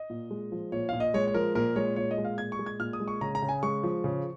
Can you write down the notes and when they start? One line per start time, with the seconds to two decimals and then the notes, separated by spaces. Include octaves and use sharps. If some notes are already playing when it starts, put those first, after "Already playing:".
Already playing: D#5
0.10 A#2
0.31 G#3
0.52 F3
0.72 A#2 C#5
0.89 A#2 F5
1.00 D#5
1.14 G#3 C#5
1.27 C#5
1.34 F3 A#4
1.55 A#2 A#4
1.76 G#3 C#5
1.96 A#2 C#5
2.11 D#5
2.18 G#3
2.25 F5
2.38 A#2 G#6
2.52 C#6
2.59 G#3
2.66 G#6
2.80 A#2 F6
2.93 D#6
3.00 G#3
3.08 C#6
3.21 C#3 A#5
3.35 A#5
3.42 C#3
3.49 G#5
3.63 G#3 C#6
3.84 F3
4.04 C#3